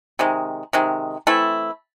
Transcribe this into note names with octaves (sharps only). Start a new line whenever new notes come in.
C3 D#3 G#3
C3 D#3 G#3
E3 A3 C4 E4